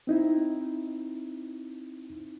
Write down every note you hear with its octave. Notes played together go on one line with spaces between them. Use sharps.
C4 D#4 E4